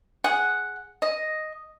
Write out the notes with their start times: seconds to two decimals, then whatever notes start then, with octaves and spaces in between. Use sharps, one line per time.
0.24 G#4 F#5
1.02 D#5